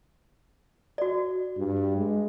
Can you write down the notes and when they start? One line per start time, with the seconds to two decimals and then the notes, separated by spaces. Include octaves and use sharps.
0.98 F#4 D5
1.57 G2
1.98 G#3